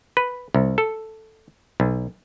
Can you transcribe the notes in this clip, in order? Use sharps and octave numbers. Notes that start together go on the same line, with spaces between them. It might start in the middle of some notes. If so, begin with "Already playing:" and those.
B4
C2
A4
B1